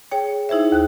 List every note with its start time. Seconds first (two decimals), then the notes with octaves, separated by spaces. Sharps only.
0.11 G#4 C#5 G5
0.49 D#4 E4 G#4 C5 E5
0.72 D#2 F#6